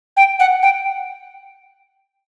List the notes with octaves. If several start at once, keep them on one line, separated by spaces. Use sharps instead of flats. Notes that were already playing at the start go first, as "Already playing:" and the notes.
G5
F#5
G5